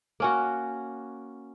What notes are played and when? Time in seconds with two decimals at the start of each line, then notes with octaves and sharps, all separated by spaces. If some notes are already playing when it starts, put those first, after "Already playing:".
0.20 A#3 C#4 F#4